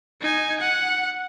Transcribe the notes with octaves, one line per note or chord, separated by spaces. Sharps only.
D#4 G#5
F#5